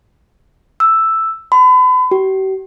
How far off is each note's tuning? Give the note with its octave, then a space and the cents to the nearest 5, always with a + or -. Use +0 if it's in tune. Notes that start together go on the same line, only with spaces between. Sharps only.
E6 +0
B5 +40
G4 -45